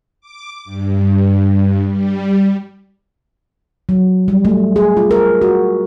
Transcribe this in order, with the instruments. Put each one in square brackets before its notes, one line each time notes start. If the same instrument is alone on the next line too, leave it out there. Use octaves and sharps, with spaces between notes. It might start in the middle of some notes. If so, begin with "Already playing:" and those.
[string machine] D6
G2
G3
[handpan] F#3
G3
A3
G#4
F4
A#4
F#4